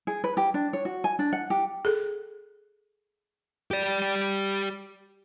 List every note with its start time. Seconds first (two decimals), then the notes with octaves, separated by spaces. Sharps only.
0.07 G#4
0.24 B4
0.37 G4
0.54 D4
0.73 C#5
0.85 F#4
1.04 G#5
1.19 D4
1.33 F#5
1.50 G4
1.85 G#4 A4
3.71 G4 D5